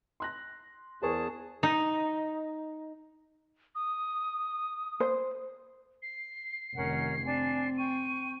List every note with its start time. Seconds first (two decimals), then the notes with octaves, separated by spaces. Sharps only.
0.20 C6 F#6 A#6
1.03 E2 G#4 A#4 C5 A5 C#6
1.63 D#4
3.75 D#6
5.00 C5
6.02 C7
6.75 F1 D#3 C#4 A#4 F#5
7.23 C4 D4 G#5
7.77 G5 C#6 D#7